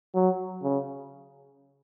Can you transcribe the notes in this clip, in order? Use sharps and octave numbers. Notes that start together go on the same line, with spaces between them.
F#3
C#3